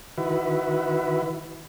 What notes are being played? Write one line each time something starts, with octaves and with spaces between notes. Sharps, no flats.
D#3 E4 F#4 B4